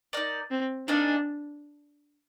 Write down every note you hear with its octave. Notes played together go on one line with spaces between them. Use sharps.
D#4 A#4 D5
C4
A#3 D4 D#4 G#4 D5